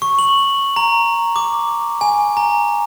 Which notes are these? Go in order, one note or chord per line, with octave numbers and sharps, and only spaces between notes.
C#6
F#7
A#5
D6
G#5
A#5